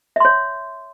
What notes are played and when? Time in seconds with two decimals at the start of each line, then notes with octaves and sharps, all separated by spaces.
0.16 E5
0.20 C6
0.25 C#5